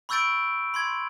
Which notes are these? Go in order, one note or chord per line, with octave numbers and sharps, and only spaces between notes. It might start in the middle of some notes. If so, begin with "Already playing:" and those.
B5 C#6 E6 G6 A6 D7
B5 C6 G#6